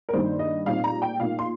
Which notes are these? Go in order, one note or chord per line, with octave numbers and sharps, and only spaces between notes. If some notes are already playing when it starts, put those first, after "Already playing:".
A#4
G2 D#3 G3 A#3 D#4 C5
D#5
A#2 G3 C4 D#4 F5
A#5
G5
A#2 A#3 D#4 F5
C6